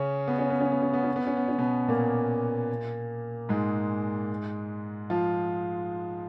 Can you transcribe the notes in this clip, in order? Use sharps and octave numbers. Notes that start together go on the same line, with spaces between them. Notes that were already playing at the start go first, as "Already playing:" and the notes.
Already playing: C#3 C#4
B3
C#4
B3
C#4
B3
C#4
B3
C#4
B3
C#4
B3
C#4
B2 B3
A#2 A#3
G#2 G#3
F3 F4